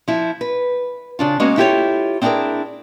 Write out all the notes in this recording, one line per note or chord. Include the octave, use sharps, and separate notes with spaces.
F3 E4
B4
C#3 D4 F4
G#3 A#3 B3 C#4 F#4
E4 F4 G4 A4 A#4 C#5
C4 D4 E4 F4 G#4 A#4